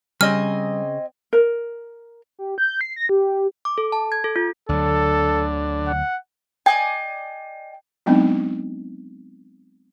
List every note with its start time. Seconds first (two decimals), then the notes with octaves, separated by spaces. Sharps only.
0.21 C#3 G3 C4 D#5 G#5 F6
1.33 A#4
2.39 G4
2.58 G6
2.81 C7
2.96 A#6
3.09 G4
3.65 D6
3.78 A4
3.92 A5
4.12 G#6
4.24 A4
4.36 F4
4.69 D2 D3 F#3 A4
5.87 F#5
6.66 D5 D#5 G5 G#5
8.06 F#3 G#3 B3 C4 D4 D#4